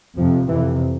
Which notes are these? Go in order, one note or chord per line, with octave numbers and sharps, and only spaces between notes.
F2 C3 F3
F2 C3 E3